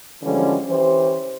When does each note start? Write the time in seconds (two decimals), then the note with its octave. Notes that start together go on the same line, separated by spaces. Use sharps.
0.22 D3 E3 F3 G3 G#3 C#4
0.67 E3 C#4 G4 C5